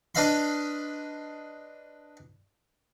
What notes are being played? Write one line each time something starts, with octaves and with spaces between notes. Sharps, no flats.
D4 B4 D#5 F5 B5 C6